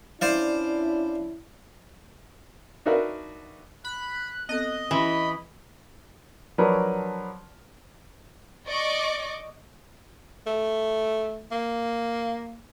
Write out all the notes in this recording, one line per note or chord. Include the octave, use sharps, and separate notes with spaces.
C#4 D4 E4 C5 D5 F5
D4 D#4 F#4 A#4 B4 E5
B5 F#6
B3 C4 A4 D#5
E3 C#4 E4 B5 C6
F3 F#3 D4 A#4 B4 C#5
D5 D#5 C#6 D6
A3
A#3